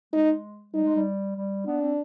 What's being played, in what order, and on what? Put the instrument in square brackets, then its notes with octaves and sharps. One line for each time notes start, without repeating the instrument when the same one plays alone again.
[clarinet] G#3 [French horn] D#4
[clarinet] G3 [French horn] D#4
[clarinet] G#3
G3
G3
[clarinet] B3 [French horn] D4
[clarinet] C4